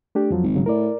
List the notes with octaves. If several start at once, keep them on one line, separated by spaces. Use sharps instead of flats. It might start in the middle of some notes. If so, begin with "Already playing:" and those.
A3 D4 G4
F2 F3 F#3
G#1
G2 C#3 F#3
A2 A#4 D5